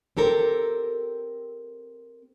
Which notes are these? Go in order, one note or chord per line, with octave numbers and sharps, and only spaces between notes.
C4 G4 A4 A#4